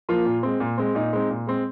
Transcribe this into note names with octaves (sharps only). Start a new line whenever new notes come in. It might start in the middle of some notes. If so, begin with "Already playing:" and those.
F3 A#3 F4
A#2
G#3 C4
A#2
G#3 C4
A#2 D#4
G#3 C4
A#2
G#3 C4